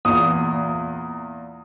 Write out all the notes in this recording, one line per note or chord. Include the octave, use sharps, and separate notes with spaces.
E2 A#2 D#6